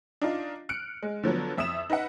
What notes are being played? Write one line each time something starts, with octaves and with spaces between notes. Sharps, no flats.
D4 D#4 F4
F6 F#6 C#7 D7
G#3
D3 F3 F#3 B3
F2 E5 D#6 E6 E7
D#4 B4 E5 F#5